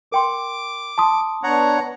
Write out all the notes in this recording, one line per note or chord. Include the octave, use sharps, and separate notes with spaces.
A#4 G5 C6 D6
A5 C6 D#6
B3 D4 C#5 F#5 A#5